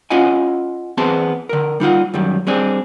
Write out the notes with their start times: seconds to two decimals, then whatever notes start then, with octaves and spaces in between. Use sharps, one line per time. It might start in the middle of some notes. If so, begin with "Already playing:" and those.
0.10 C#4 E4 F4 D#5 F#5 G#5
0.97 E2 B3 C4 G#4 A5 C6
1.49 D3 A#4
1.80 G3 D#4 F4 F#5
2.14 F#2 D#3 G3
2.47 G3 C4 D4 G#4